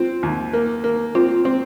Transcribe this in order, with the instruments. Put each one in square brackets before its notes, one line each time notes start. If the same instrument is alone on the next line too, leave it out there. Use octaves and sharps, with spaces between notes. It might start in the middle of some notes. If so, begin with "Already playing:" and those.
Already playing: [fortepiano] C4 [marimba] F4
[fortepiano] D#2
A#3
A#3
[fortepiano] C4 [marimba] F4
[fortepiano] C4